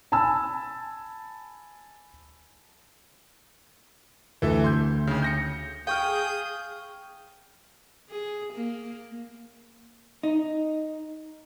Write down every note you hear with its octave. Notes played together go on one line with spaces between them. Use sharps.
G#5 A5 B5 E6
D2 E3 A4 E5
C6 G6
D#2 C#3
G6 A#6 C#7
G#4 F5 G5 C#6 D#6 F6 G6
G#4
A#3
D#4